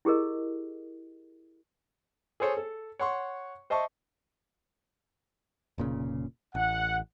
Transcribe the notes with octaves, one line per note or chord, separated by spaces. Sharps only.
E4 G4 G#4 A#4 D#5
G#4 A4 C5 C#5
A4
C#5 F#5 C6 C#6
C5 D#5 E5 A5 C#6
F1 A#2 C#3
A1 F#5